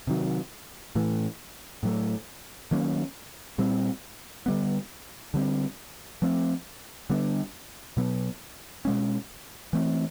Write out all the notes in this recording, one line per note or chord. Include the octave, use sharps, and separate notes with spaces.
C3 D#3 F#3
A2 E3 A3
A2 F#3 A3
D#3 F#3 A#3 C#4
A#2 G3 C4
D3 G3 B3
D3 G3 C4
F3 A3 C4
D3 G3 B3 D4
B2 F#3 B3
B2 G#3 C#4
E3 A3 C4